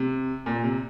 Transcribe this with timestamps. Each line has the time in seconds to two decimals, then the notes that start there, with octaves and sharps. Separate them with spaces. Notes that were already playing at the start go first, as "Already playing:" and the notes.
Already playing: C3
0.46 A#2
0.64 C3